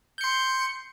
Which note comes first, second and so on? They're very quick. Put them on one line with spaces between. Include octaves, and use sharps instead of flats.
G6 C#7 C6